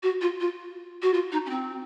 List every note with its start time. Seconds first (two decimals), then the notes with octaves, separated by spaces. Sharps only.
0.03 F#4
0.21 F4
0.40 F4
1.02 F#4
1.14 F4
1.32 D#4
1.46 C#4
1.50 C4